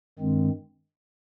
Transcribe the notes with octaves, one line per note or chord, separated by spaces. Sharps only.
G2 D#3 G#3 C4